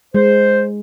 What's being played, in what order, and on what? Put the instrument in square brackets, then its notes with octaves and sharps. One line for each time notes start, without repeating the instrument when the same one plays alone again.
[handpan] G#3 [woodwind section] C5